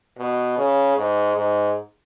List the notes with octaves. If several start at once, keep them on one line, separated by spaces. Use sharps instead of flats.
B2
C#3
G#2
G#2